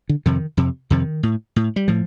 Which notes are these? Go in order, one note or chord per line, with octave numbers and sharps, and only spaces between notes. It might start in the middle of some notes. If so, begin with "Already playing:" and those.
D3
F2 C3 D#3
F2 C3
F2 C3 D#3
A2
A2
G3
A2 F3